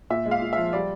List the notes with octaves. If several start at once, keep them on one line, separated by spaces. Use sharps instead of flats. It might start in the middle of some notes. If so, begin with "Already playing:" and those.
A#2 E5
G#3
F5
A#2
F3 E5
G3 D5